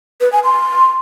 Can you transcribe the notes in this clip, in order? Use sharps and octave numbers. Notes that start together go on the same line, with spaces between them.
B4
G#5
C6